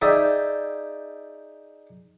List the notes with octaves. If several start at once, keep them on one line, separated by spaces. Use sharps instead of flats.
D#4 G#4 D5 E5 G5